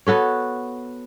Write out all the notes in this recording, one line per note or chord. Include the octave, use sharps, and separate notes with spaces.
B3 F#4 A4 C#5